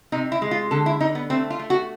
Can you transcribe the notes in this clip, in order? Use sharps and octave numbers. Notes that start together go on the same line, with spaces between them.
C3 D#4
E4
G#3
F4
D3 A4
E4
D3 D#4
B3
A3 C4
F4
A3
F#4